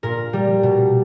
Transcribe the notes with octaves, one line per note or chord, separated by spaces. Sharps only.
A#2 A#4
G3
B2